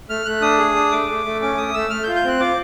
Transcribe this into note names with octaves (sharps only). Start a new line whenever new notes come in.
A3 F6
A3 F#6
D4 D#6
G#4
D4
A3 D6
A3
A3
C#4 D6
A3 D#6
A3 E6
A3 F6
G6
F4
G6
C4 F#6
F4 D6